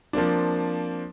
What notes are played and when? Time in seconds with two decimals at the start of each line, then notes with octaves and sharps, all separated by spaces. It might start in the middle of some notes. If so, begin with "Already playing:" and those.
0.13 F3 A#3 C4 D4